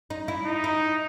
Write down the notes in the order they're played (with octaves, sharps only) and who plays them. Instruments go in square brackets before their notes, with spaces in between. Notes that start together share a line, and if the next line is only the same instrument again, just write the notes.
[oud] D#4
E4
[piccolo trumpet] D#4
[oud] E4